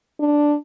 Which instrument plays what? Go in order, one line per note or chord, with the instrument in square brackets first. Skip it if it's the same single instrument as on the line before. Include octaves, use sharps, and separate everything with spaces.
[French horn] D4